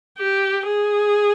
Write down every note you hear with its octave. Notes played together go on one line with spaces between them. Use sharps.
G4
G#4